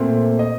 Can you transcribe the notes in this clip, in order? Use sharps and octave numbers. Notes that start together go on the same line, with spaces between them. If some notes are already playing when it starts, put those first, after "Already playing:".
Already playing: A#2 A3 C4
D#5